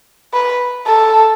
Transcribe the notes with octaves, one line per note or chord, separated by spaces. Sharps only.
B4
A4